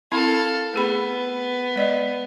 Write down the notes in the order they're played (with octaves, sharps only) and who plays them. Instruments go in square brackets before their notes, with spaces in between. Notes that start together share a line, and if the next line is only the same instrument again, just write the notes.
[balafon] C4 E4 B5 [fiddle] A4 F5
[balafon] A3 G#4 B5 [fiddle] B3
[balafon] G#3 D5 D#5